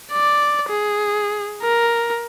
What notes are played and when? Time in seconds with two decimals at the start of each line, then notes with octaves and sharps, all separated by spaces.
0.12 D5
0.69 G#4
1.63 A#4